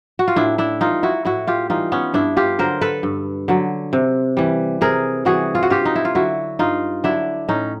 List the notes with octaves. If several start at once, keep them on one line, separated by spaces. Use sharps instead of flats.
F#4
F4
A2 D4 E4
D4 E4
E3 G3 D#4 F4
E4 F#4
A2 E4 F#4
F4 G4
E3 G3 D#4 F4
B3 C#4
G2 D4 E4
F4 G4
D3 F#3 A#4 C5
A4 B4
G2
D3 F#3
C3
E3 G3
C3 G#4 A#4
E3 G3 F#4 G#4
F4
F#4
G2 F4 G4
D#4
E4
F4
D3 F#3 E4 F#4
G2 D#4 F4
D3 F#3 D4 E4
A2 C#4 D#4